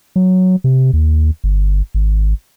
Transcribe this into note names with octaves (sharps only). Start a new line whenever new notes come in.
F#3
C3
D#2
G1
G#1